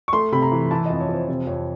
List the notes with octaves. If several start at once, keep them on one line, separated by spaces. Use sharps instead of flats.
C#6
A3 C6
C3 B5
A#5
E3
E3 A5
F2 D#5
C#5
F2
C5
C3 C5
F2 C#5